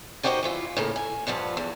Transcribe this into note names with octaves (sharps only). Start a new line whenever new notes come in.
D#3 F#4 G4 C5 D5 D#5
E3 E4 F4
A2 C#3 A#3
G#5
G2 F3 F4 F#5
E2